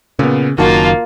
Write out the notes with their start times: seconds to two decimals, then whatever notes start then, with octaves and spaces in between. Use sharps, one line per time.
0.19 A#2 C#3 B3
0.58 F#1 F#2 D#3 A#3 F4 F#4 A5